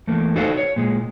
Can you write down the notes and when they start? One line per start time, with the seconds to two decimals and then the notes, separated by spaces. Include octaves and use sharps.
0.07 E2 A3 A#3
0.36 D#4 F#4 A4 C5 D5 F5
0.57 C#5
0.76 A#2 G#3